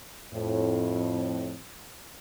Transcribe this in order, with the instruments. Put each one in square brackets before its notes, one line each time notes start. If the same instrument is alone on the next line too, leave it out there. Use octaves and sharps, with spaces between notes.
[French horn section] F2 A2